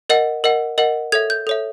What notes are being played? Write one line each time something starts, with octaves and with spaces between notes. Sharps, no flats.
A#4 D#5 F#5
A#4 D#5 F#5
A#4 D#5 F#5
A4 C#5 E5 G#6
G6
A4 C#5 E5